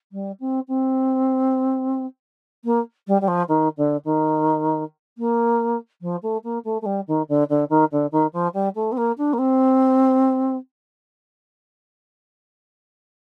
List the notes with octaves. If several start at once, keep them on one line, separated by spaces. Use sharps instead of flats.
G3
C4
C4
A#3
G3
G3
F3
D#3
D3
D#3
A#3
F3
A3
A#3
A3
A3
G3
D#3
D3
D3
D#3
D3
D#3
F3
G3
A3
C4
A#3
D4
A#3
C4